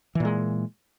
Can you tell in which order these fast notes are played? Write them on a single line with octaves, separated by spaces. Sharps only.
E3 A#2 G#3